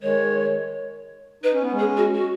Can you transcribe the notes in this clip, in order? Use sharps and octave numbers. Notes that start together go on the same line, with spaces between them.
D#3 G#3 C#5
D#4 B4
C#4
B3
G#3 C#4
G#4
F#4
F#4